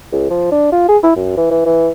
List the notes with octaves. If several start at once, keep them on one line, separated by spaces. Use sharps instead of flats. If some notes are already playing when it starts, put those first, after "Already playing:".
C#2
F3
D4
F4
G#4
E4
F#2
E3
E3
E3